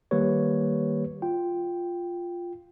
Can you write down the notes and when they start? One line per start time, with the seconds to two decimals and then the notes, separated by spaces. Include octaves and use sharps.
0.11 D#3 G3 A#3 G4 B4 C#5
1.22 F4 G5